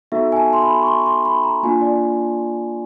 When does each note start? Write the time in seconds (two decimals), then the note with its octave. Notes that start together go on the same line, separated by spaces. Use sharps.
0.12 B3 D#4 F#4 A4 E5
0.32 G#5
0.37 A5
0.53 C6
0.62 B5
0.82 C#6
0.87 C6
1.06 C6
1.25 B5
1.44 A#5
1.63 A#3 D4 F4 G#5
1.81 D5